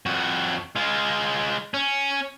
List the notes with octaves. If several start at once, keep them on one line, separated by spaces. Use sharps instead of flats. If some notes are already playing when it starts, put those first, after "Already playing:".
F2 F#4
G#3 F4
C#4